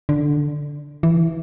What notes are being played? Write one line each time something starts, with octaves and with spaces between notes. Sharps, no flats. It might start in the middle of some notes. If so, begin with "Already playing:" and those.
D3
E3